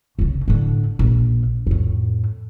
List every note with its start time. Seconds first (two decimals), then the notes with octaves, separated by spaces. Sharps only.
0.19 F1 C#3
0.48 A2 D3
0.99 A#1
1.67 F2 A2